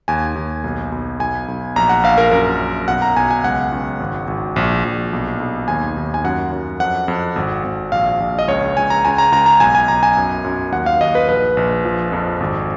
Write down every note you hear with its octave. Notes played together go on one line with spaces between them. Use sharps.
D#2 G#5
D#2
B1
B1
B1 G#5
B1
A#1 A#5
F#5
A#1 F5
A#4
F#2 A#4
F#2
B1 F#5
A#5
B1 G#5
G#5
C#2 F#5
C#2
G#1
G#1
A#1
A#1
B1
B1
D#2 G#5
D#2
G#5
F#2 F#5
F#2
F2 F#5
F2
G#1
G#1
A#1 F5
A#1
D#5
C#2 C#5
C#2 G#5
A#5
C#2 G#5
A#5
C#2 A#5
A#5
B1 G#5
G#5
B1 A#5
G#5
F#2
F#2
D#2 F#5
F5
D#2 D#5
B4
A#1 B4
A#1
F3
F2
G#1